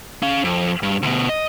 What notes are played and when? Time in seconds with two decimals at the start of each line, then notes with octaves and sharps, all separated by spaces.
0.23 C#4 F5
0.44 F2
0.83 G2
1.02 D2 B2
1.29 D#5